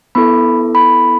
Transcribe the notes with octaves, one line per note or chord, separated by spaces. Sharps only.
B3 E4 A4 B5
B5